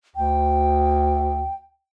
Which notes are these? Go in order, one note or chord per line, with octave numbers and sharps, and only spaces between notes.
D2 G5